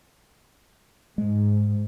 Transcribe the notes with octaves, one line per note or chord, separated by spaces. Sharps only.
G#2 G#3